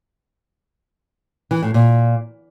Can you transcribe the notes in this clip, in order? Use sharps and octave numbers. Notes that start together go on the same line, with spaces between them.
E3
A2
A#2